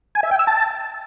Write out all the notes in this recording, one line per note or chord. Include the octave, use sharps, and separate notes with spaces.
G#5
E5
G5
E6
A5